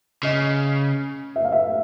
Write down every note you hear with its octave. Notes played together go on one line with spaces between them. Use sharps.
C#3 D#5
E5
F5
E5